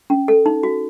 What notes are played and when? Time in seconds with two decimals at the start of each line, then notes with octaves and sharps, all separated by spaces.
0.10 C#4
0.28 A4
0.46 D#4
0.63 F#4